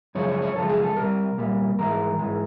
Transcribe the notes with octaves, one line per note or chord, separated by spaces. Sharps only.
F#2 C#3 F3 G#3 C#5
C#5
C#5
F#2 C#3 F3 G#3 A4
G#4
A4
C2 A#2 G3 A#4
C2 A#2 G3
G#2 E3 G#3 A#4
G#2 E3 G#3